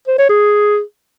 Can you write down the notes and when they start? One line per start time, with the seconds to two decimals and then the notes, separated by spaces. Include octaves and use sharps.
0.08 C5
0.18 C#5
0.29 G#4